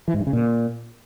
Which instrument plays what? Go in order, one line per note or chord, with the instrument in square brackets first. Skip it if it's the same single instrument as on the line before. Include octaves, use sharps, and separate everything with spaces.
[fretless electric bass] E3
G#2
G2
C#3
A#2